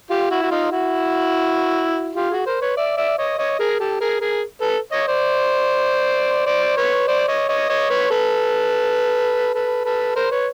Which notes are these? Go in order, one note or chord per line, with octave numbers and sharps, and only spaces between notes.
F4 G4
E4 F#4
F#4
D#4 F4
E4 F#4
F4 G4
F#4 G#4
A#4 C5
B4 C#5
D5 E5
D5 E5
C#5 D#5
C#5 D#5
G#4 A#4
G4 A4
G#4 A#4
G#4 A#4
A4 B4
C#5 D#5
C5 D5
C5 D5
B4 C#5
C5 D5
C#5 D#5
C#5 D#5
C#5 D#5
B4 C#5
A4 B4
A4 B4
A4 B4
A#4 C5
B4 C#5